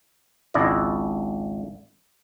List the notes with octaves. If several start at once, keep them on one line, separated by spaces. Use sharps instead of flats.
G#1 C#2 D4 E4 D5 D#5